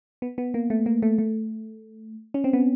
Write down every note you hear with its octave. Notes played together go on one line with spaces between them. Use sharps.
B3
B3
A#3
A3
A#3
A3
A3
C#4
C4
B3